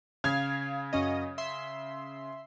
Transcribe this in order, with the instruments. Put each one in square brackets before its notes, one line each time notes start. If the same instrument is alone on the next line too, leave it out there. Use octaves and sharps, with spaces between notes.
[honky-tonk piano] C#3 G#6 [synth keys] F5
[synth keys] F#2 C#4 D#5
E5 C6